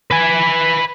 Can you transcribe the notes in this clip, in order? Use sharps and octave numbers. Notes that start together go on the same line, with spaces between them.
B4 G#5